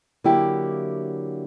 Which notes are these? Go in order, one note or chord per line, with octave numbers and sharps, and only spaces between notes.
D3 F#3 A#3 E4 G4